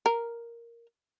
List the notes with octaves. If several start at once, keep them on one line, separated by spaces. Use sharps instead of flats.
A#4